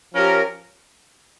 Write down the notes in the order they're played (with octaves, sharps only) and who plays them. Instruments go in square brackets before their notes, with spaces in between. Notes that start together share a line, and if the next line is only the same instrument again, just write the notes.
[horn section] F3 C#4 G4 A#4